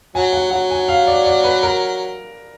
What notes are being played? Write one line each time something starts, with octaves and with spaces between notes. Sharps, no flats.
F#3 G#5
F#5
F#3 F#5
G#5
F5
D5
D5
B4
A#4